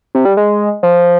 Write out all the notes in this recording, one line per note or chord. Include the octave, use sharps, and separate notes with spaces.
C3
G3
G#3
F3